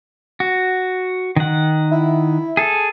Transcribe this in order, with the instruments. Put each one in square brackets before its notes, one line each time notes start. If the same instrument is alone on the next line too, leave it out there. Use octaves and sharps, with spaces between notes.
[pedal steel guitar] F#4
D#3 F#5
[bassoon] E4
[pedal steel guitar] G#4 A4